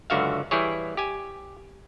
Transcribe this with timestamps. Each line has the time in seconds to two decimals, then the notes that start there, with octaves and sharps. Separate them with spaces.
0.10 C#2 F#2 D3 F#4 E5 F5
0.51 E3 G3 E4 G#4 C#5
0.97 G4 G#5